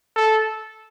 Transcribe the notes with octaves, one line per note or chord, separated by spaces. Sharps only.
A4